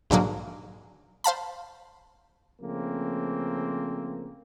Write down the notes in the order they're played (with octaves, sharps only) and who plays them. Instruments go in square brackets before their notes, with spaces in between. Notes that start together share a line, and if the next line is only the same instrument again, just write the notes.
[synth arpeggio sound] B1 G#2 D3 F#3 A#3
C5 F5 A5 B5
[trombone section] C#3 F3 A3 A#3 C4